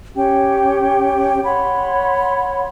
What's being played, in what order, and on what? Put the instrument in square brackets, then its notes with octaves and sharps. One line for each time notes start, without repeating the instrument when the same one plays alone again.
[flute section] C#4 G4 G5
C#5 F#5 B5 C6